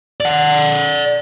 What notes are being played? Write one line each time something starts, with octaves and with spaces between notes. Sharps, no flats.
D5 F#5